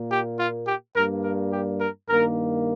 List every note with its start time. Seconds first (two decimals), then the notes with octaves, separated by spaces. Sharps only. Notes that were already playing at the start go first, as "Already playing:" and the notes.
Already playing: A#2 A#3
0.11 G4
0.40 F4
0.67 G4
0.96 G2 G3 A#3 A#4
1.24 A#4
1.52 G4
1.81 A#4
2.09 G2 D#3 A#3 A#4